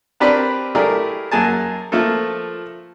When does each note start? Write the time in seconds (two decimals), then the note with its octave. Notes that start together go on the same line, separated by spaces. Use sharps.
0.20 C4 D4 G4 A#4 B4 D5
0.75 A3 E4 G4 G#4 A#4 D5
1.31 F#2 A#3 G#4 G#5 A5
1.92 F3 A3 A#3 F4 A4